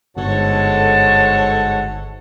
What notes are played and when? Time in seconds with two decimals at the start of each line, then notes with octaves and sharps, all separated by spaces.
0.17 G1 G#2 G#3 F#4 A4 C#5 F#5 A5